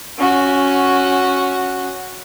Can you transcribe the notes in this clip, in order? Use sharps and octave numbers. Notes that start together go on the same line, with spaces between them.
C#4 F#4